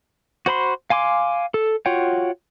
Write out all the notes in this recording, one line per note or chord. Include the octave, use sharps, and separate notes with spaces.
F#4 C5 B5 C6
F5 G#5 C6 D6
A4
F4 F#4 C#5 F#5 G5